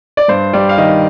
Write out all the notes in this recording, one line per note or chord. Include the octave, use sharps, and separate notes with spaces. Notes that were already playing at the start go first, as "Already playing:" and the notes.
D5
G2 C5
G3 D5
F5
D#3 D#5